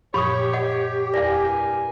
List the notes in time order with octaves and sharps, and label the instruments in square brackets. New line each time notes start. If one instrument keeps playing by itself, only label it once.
[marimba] F#2 A#2 F3 [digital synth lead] G4 [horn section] C#5 [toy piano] B5 C#6 D#6
[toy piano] D#5 F#5 D6
[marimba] E2 A#6 [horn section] G2 A#3 G#5 [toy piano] D5 F5